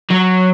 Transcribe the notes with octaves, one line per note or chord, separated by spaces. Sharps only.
F#3